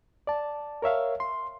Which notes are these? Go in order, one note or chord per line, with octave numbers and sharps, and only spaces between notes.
D5 A5
A#4 C#5 E5 F5
C6